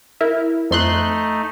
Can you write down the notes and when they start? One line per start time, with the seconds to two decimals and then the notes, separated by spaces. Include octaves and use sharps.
0.21 E4 A#4
0.71 F2 A3 D#4 C6 F#6